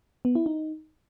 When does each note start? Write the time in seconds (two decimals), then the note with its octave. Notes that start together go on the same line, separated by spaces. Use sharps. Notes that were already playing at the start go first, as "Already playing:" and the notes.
0.25 B3
0.35 E4
0.46 D#4